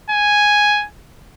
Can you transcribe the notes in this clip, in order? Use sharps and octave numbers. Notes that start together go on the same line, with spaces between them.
G#5